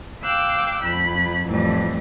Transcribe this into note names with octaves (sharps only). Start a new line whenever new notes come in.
F5 G5 D6 E6 F#6
F2 B5
F2 A2 E3 G3